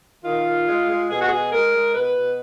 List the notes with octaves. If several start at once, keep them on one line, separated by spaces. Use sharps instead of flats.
D#3 F4
D#3
G#3
G#3
B2 G#4
F#4
B2 G#4
G#3 A#4
G#3
B2 B4
B2